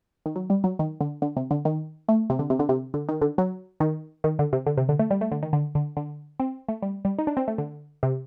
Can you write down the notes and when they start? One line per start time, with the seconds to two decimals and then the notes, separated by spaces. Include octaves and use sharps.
0.26 D#3
0.36 F#3
0.50 G3
0.64 F#3
0.79 D#3
1.01 D3
1.22 D3
1.37 C3
1.51 D3
1.65 D#3
2.08 A3
2.30 C3
2.39 D3
2.50 C3
2.59 D3
2.69 C3
2.94 D3
3.09 D#3
3.22 D3
3.38 F#3
3.80 D#3
4.24 D#3
4.39 D3
4.53 C3
4.66 D3
4.78 C3
4.89 D3
4.99 A3
5.11 G3
5.21 A3
5.32 D3
5.43 D#3
5.53 D3
5.75 D3
5.97 D3
6.40 C4
6.69 A3
6.82 G3
7.05 G3
7.19 D#4
7.27 D4
7.37 C4
7.48 A3
7.58 D3
8.03 C3